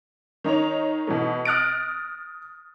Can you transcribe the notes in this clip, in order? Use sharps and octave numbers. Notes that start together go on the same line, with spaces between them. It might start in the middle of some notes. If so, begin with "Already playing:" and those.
D#3 D#4 C#5 F7
B2 E3 A3
D#6 F6 F#6 A6 A#6 D7